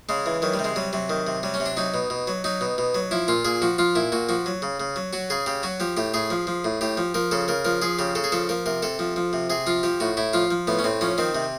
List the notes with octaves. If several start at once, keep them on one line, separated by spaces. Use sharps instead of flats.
C#3 G#3
E3
D#3 F#3
G3
C3
G#3
F#3 G3
C3 F#3
D#3
C3
F#3 G3
C#4
C3
D4
F#3 D#4
B2
B2
F#3
F#3 D#4
B2
B2
F#3
F3 E4
A#2 F4
A#2 G#4
F3 F#4
F3 F4
A#2 E4
A#2 F#4
F3 F#4
F#3
C#3
C#3
F#3
F#3 F#4
C#3 G#4
C#3 G4
F#3 F#4
F3 G4
A2 G4
A2 G#4
F3
F3
A2
A2 G4
F3
F3 A#4
C#3 A4
C#3 A#4
F3 A#4
F3 G#4
C#3 G4
C#3 A4
G#4
F3 A4
F3 A#4
C3 A#4
C3 A4
F3
F3
C3
C3 G#4
F3 F4
F3 G4
A2 F#4
A2 E4
F3 F4
F3
A2 B3
C#4
A2 C4
F3 C#4
D#3 C4
C3